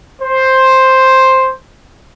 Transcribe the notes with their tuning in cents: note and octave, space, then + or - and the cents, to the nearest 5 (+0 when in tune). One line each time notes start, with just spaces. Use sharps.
C5 +5